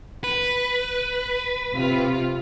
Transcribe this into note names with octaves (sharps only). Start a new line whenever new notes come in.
B4
C3 F4